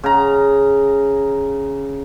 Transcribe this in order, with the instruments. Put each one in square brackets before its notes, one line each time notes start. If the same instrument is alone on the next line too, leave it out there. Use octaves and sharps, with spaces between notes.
[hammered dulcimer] C#3 A#5